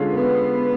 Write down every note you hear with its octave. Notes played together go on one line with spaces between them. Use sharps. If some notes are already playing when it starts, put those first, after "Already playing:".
Already playing: D3 G#3 C#4 F4
B3